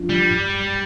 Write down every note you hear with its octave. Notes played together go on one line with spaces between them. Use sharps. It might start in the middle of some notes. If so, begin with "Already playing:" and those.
Already playing: F3 D4 F4
G3
G2